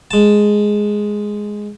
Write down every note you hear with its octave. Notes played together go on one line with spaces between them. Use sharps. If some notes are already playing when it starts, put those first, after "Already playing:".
G#3 A5